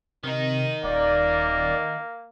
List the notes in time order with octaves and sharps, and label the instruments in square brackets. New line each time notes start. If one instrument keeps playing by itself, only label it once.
[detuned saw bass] C3 [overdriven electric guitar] D#3 D#4
[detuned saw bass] D#1 [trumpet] A#3 [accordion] D5